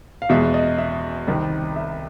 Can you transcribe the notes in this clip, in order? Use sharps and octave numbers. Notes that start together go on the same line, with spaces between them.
F5
E2 B2 G#3 E5
D#5
E5
C2 C3 D#3
E5